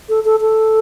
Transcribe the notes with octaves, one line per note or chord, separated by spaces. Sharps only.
A4
A4
A4